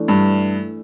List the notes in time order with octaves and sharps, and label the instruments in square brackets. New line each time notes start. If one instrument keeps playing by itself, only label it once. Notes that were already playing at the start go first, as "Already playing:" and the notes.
Already playing: [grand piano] E3 A3 D4
[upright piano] G2